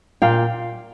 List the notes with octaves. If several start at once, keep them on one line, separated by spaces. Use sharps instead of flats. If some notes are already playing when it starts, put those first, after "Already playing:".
A#2 F5 G5